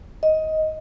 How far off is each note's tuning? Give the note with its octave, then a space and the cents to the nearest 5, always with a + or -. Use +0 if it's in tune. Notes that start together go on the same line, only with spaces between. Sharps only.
D#5 +15